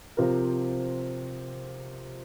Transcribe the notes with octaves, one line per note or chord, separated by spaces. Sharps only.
C3 F3 C4 F4 A#4